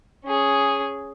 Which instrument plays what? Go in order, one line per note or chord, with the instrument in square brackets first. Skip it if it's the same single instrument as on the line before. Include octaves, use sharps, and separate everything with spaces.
[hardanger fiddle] C#4 G#4